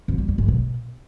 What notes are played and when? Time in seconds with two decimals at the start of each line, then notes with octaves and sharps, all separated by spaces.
0.08 F2
0.18 G3
0.28 F#2
0.38 G#2
0.48 B2